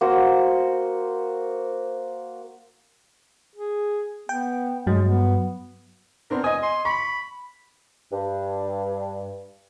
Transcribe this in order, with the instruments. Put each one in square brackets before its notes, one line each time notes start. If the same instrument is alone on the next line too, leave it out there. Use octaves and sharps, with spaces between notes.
[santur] A#3 F#4 C5
[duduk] G#4
[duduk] B3 [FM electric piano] G5
[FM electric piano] G2 F#3 [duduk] G#3
[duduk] B3
[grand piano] B3 C4 D4 [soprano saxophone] A#4
[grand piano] D#5 D#6 [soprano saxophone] G#5
[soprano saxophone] C6
[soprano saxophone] B5 [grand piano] C#6
[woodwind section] G2